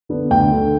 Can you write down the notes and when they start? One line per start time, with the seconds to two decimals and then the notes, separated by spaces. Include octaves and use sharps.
0.09 D3 B3 D4
0.30 D2 G5
0.51 D3 A3